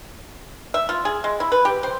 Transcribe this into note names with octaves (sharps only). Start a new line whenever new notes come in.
E5
F4
G#4
G#3
E4
B4
G4
C5